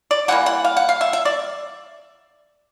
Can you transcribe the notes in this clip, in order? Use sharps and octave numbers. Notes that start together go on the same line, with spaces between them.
D5
E3 G3 A#3 F#5
F#5
F5
F#5
F5
E5
E5
D5